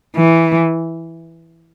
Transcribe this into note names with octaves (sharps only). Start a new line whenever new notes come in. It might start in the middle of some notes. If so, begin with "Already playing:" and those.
E3